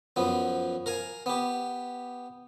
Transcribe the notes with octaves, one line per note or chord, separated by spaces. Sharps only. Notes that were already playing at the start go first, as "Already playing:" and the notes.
F#2 F3 B3
A#4 F5 G#5
B3 G4